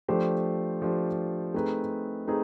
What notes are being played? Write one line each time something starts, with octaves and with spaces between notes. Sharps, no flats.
F3 A3 D4 G4 C5
F3 A3 D4 G4 C5
A3 C4 D#4 G#4 B4
A3 C4 D#4 G#4 B4